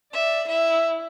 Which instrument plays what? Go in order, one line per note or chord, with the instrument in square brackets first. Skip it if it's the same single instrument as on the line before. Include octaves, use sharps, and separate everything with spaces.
[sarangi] D5 [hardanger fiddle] E5
[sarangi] E4 [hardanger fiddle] E5